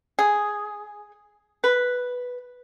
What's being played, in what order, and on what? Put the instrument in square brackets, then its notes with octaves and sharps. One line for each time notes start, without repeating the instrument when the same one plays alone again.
[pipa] G#4
B4